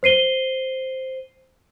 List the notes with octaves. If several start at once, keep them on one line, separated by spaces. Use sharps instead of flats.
C5 C7 D#7 G7